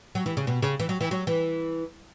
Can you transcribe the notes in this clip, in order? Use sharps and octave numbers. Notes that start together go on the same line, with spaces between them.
F#3
E3
C#3
B2
C#3
E3
F#3
E3
F#3
E3